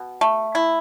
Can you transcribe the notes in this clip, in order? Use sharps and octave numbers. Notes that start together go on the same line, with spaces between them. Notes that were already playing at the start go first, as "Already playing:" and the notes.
Already playing: B2
A3
E4